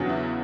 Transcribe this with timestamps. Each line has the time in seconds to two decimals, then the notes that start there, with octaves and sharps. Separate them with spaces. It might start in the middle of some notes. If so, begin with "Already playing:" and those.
Already playing: E2 C#3 F#3 B3 D4
0.09 E4